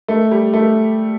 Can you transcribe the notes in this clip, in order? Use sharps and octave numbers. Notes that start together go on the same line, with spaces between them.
A3
G3
A3